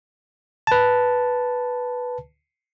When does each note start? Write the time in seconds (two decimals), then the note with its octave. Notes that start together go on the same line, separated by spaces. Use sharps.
0.67 B4 A5